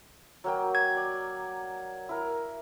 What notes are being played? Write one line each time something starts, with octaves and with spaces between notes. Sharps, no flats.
F#3 A#3 G5
G#6
D5
E4 A#4